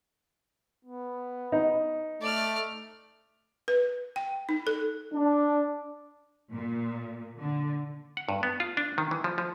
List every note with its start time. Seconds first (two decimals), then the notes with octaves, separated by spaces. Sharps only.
0.85 B3
1.52 D#4
2.22 A3 D5 F6
3.68 B4
4.16 G5
4.49 D#4
4.67 A4
5.14 D4
6.53 A#2
7.40 D3
8.17 F#5
8.29 G2
8.43 B3
8.60 F4
8.77 D4
8.98 D#3
9.11 E3
9.24 F3
9.38 F3